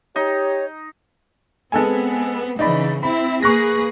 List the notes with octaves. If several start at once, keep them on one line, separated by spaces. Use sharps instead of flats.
D#4 G4 C#5
G#3 B3 C4 A4 G#5
C#3 E3 D#4 D5 B5
C4 E4 B5
A#3 G#4 B4 C#6 F#6 A#6